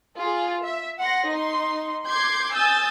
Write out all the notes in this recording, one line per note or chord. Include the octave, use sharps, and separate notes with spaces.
F4 G#4
E5
F#5 C6 A#6
D#4 C6
C6 D6 G6 G#6 C7
G#5 D#6 E6 G6 A6